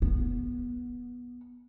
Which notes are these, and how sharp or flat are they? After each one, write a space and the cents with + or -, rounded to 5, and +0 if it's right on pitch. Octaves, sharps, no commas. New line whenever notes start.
B3 -15